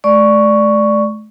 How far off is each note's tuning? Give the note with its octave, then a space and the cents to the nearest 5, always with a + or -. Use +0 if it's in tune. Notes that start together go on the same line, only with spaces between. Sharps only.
A3 -40 D5 +0 C#6 +5